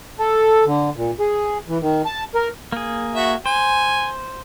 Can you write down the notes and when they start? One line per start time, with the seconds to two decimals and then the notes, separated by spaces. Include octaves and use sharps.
0.19 A4
0.67 D3
0.96 A#2
1.20 G#4
1.68 E3
1.81 D#3
2.05 A5
2.35 A#4
2.72 A#3 G#4
3.15 F#4 E5
3.46 C5 G#5